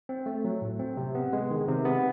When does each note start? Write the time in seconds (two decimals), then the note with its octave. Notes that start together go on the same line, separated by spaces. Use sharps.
0.09 C4
0.26 A3
0.45 F#3
0.61 A2
0.79 C4
0.97 C3
1.15 B3
1.33 G#3
1.51 D#3
1.68 C3
1.85 B3